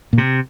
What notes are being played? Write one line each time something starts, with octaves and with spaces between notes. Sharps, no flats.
A#2
C3